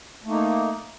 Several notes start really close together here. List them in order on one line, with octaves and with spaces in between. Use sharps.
A3 A#3 D#4